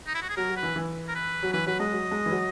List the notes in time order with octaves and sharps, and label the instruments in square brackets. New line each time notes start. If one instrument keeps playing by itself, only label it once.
[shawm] D#4
E4
F#4
G#4
[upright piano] F#3 [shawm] A#4
[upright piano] F#3
[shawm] B4
[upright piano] E3
E3
[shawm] A#4
B4
[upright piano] F#3
[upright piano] E3 [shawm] B4
[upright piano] F#3 [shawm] B4
[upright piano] G#3 [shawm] D#5
[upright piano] F#3
G#3
E3
F#3